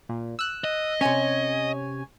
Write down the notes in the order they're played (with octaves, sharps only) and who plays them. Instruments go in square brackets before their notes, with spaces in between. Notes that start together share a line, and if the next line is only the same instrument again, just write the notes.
[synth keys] A#2
E6 F#6
[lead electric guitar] D#5
[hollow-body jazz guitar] C3 C#4 [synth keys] C#5 G#5